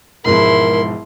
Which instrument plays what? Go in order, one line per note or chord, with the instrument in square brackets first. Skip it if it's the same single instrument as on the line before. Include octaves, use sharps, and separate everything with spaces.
[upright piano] E1 G#2 F3 [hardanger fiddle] E4 C6 [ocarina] A#4